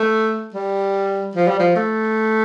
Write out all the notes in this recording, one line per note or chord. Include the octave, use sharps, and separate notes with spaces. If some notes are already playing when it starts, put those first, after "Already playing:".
Already playing: A3
G3
F3
G3
F3
A3